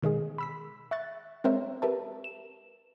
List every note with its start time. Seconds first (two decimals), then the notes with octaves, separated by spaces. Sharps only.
0.02 B2 D#3 G#3 G#4
0.38 B5 E6 B6
0.91 E5 C#6 F#6 A6
1.44 G#3 C4 A#4 C5 C#5 E5
1.82 G4 A#4 B4 E5 A5
2.24 E7